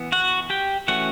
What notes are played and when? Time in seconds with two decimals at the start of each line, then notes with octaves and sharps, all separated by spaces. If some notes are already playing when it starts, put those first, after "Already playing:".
Already playing: E3 B3
0.12 F#4 F#5
0.50 G4 G5
0.88 E3 A3 C#4 F#4 F#5